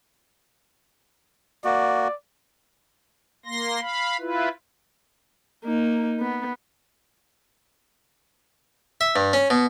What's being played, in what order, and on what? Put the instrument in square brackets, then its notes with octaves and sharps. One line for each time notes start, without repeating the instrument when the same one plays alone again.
[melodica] A#3 F#4 [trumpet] D5
[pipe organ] A#3 C6 A#6
F5 B5
E4 F4 B4
[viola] A#3 D#4
B3
[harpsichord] E5
G2
C#4
B2